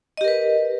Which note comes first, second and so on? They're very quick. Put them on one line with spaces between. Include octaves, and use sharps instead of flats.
D#5 G4 A#4 B4